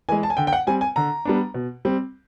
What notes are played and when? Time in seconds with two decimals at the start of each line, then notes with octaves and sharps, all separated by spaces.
0.09 E3 G#3 G#5
0.23 A5
0.30 G#5
0.37 D3 G5
0.47 G5
0.53 F#5
0.67 G3 C4 G#5
0.81 G#5
0.96 D3 A#5
1.25 G3 B3 D4
1.54 B2
1.85 G3 C4